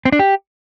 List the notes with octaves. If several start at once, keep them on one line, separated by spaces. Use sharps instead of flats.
C4
D4
G4